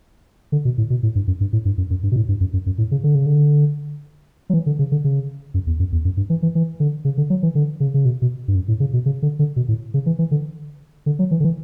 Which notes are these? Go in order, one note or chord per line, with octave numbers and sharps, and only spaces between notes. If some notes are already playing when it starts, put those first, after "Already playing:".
D3
B2
A2
B2
A2
G2
F#2
G2
A2
G2
F#2
F#2
G2
B2
A2
G2
F#2
F#2
F#2
A2
C#3
D3
C#3
D3
F#3
E3
D3
C#3
D3
C#3
F#2
E2
F#2
E2
F#2
G2
E3
E3
E3
D3
C#3
D3
F#3
E3
D3
C#3
C#3
B2
B2
G2
F#2
A2
C#3
B2
C#3
D3
D3
B2
A2
C#3
E3
E3
D3
D3
F#3
E3
D3
E3